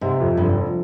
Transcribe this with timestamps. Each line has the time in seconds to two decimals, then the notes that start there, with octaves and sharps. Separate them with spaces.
0.01 G#2 C3
0.20 F2
0.37 F1 G2
0.56 F3